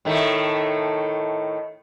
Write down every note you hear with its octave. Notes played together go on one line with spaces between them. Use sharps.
A2 D#3 A3